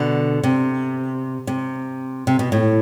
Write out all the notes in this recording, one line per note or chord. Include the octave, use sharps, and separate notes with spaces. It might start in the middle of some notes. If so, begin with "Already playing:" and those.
Already playing: B2 D3
C3
C3
C3
B2
A2